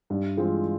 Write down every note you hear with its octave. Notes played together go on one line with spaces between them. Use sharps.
G2
E3 G#3 C4 F4